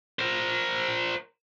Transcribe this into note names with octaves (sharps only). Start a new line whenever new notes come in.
A#4 C5